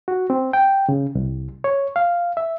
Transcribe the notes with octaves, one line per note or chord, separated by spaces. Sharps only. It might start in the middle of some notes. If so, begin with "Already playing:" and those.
F#4
C4
G5
C#3
C2
C#5
F5
E5